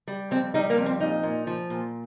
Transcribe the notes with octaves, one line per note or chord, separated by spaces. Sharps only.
G3
F2 C4
G3 D#4
A#3
F2
C4
A#2 D#4
A#2
F3
A#2